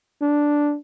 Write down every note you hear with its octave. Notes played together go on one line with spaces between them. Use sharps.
D4